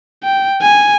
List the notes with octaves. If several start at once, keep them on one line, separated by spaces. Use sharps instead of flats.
G5
G#5